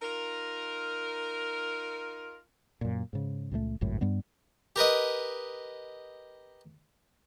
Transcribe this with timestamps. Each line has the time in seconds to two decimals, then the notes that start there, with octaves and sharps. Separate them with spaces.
0.01 D#4 F4 A#4
2.81 F#2 A#2
3.13 G#2 C#3
3.51 C#2 A#2 G3 A3
3.81 G#1 C#2 F#2 A2
4.01 G2 G3 B3
4.76 G4 A#4 B4 D#5